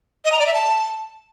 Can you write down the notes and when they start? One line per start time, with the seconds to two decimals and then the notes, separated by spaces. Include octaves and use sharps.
0.25 D#5
0.32 A#5
0.39 D5
0.46 E5
0.54 A5